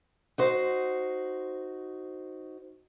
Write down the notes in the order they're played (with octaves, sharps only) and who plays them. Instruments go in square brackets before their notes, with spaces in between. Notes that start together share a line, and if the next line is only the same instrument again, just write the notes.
[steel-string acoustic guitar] D#4 F#4 C5